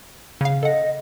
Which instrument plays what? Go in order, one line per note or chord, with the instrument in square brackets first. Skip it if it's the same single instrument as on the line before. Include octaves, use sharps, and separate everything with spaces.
[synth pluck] C#3 F5
[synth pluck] A4 F#5 [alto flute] D#5